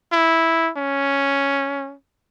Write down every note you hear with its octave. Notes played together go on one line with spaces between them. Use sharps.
E4
C#4